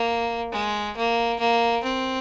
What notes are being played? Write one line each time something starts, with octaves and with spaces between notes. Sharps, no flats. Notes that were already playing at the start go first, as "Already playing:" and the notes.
Already playing: A#3
G#3
A#3
A#3
C4